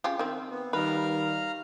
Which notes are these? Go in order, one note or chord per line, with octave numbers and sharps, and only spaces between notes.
C#3 F4 G4
D#3 C4
B3
D#3 G3 B4 F5 A#5 F6